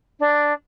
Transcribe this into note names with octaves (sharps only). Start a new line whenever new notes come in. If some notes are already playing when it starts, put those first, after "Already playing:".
D4